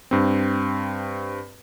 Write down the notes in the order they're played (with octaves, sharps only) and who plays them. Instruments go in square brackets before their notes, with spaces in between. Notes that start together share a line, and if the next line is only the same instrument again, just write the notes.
[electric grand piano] G2 C4